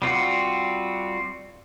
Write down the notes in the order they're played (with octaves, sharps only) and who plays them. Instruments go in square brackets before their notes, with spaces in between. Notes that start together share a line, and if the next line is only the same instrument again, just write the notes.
[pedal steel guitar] G3 C4 F4 F#4